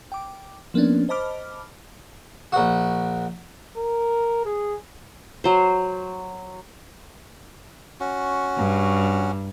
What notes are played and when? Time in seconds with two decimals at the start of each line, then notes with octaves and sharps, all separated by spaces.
0.12 G5 D6
0.74 F3 A#3 B3 C#4 D4
1.09 C5 D#5 A5 B5 D6 F6
2.52 A#1 F#4
3.77 A#4
4.45 G#4
5.44 F#3 C5
8.00 C#4 F#4
8.57 G2